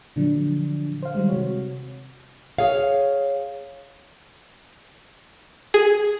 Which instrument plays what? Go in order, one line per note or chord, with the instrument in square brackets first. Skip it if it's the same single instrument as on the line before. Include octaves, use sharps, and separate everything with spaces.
[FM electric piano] A#2 D3 F3 F#3 D4
C5 F5
D#3 G3 G#3
C3 F#4 C#5
[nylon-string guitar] G#4 C#5 F5
[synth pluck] G#4